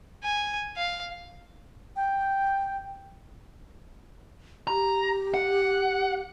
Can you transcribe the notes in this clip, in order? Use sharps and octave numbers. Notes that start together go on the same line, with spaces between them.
G#5
F5
G5
G4 A#5
F#5